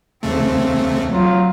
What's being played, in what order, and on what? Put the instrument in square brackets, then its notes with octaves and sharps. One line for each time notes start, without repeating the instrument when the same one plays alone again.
[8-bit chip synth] D#2 C#3 A3 [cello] C4
[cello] F#3 F4